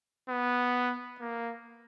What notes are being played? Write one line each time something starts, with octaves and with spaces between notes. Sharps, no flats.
B3
A#3